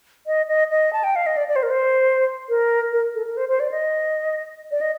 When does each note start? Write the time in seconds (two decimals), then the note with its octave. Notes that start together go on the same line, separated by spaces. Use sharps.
0.27 D#5
0.48 D#5
0.70 D#5
0.93 A5
1.04 G5
1.16 F5
1.26 D#5
1.37 D5
1.48 D5
1.56 C5
1.63 A#4
1.70 C5
2.49 A#4
2.92 A#4
3.15 A4
3.27 A#4
3.37 C5
3.49 C5
3.60 D5
3.71 D#5
4.71 D5
4.81 D#5